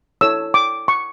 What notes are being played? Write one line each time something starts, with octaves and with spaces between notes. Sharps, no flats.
E4 A4 C#5 E6
D6
C#6